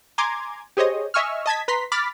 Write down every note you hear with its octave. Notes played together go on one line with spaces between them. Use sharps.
G#5 A#5 C6 D6 G#6
G4 G#4 C5 C#5 D#5
D#5 E5 G#5 C#6 E6 F6
D#5 A5 G#6 B6
B4 A#5 C6 B6
B5 D6 F6 A6 B6